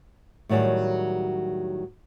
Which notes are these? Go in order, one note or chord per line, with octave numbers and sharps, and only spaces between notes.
A2 D#3 F#3 G3 G#4